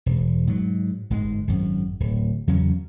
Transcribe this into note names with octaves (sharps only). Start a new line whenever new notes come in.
E1
G#2 F#3
G1 G#2 G#3
G#1 F#2
D1
E2 C#3 F#3 C#4